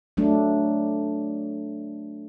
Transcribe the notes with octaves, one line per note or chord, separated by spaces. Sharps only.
F#3 A3 D4